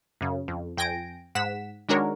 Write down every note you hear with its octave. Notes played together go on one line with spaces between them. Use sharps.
F#2 C#3
F2
F2 G5 G#5 A#6 D7
G#2 F#5 B6 E7
D#3 G#3 D4 F#4 A#4 C#5